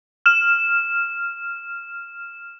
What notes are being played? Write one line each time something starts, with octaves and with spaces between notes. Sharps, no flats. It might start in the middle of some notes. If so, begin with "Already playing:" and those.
F6 E7